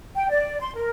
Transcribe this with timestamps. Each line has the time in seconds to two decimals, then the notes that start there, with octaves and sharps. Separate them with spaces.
0.15 G5
0.29 D5
0.61 C6
0.75 A#4